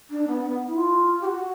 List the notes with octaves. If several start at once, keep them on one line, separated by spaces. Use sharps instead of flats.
D4
B3
B3
E4
F4
G4
F#4